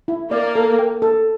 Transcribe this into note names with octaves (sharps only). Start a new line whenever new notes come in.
E4
A#3 D5
A4
G5
A4